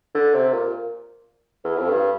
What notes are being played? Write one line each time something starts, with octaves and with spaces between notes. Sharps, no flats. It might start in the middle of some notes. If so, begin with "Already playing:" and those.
D3
C3
A#2
E2
F2
G2